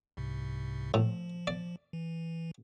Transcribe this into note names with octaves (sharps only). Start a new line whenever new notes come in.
C2 G#2 C3
A2 F3
D5
E3